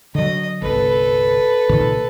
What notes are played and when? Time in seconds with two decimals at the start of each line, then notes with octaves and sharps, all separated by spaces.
0.15 D3 F#3 D#5
0.62 G1 C2 A4 B4
1.69 C2 A#2 D#3